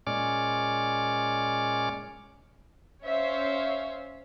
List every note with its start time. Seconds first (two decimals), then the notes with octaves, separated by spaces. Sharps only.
0.07 A#2 G#3 C#4 D5 D6 F6
3.05 C#4 C5 C#5 E5 F5